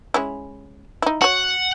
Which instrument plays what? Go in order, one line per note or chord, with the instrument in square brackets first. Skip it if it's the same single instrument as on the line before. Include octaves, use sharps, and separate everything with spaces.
[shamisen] G#3 C#4 E4
D#4 E4
[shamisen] F#4 C#5 [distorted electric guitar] F#5